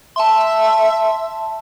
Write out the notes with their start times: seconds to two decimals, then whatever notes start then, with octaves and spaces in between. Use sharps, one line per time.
0.16 E5 A5 C6